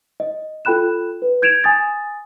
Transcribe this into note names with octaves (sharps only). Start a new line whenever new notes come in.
D#5
F4 A4 G5 B5 F#6 E7
B4
G6 G#6 D7 E7 F7
G#5 D#6 A6